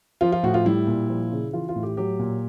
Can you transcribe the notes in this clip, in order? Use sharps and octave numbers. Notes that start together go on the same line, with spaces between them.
F3 F4
F4
A2 F#4
F4
G3 E4
A#2
F3
C#3
E3 F4
F4
A2
G4
F#3 G4
A#2